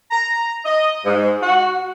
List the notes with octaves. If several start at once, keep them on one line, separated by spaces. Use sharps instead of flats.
A#5
D#5
G#2
F#4